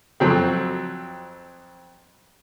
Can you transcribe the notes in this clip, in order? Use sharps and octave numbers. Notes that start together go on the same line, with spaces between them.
F2 F#3 C4